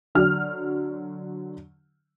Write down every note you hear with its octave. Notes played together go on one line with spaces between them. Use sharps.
D3 F#3 F6